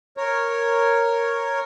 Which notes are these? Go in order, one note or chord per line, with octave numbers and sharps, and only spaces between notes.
A#4 C#5